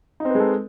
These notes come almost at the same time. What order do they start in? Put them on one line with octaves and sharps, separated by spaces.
D#4 C4 B4 G#3 A4